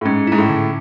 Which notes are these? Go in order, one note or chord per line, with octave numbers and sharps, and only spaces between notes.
A2
G#2 C#4
G#2 E4
A2
D3